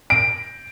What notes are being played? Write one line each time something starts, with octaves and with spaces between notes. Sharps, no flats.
D7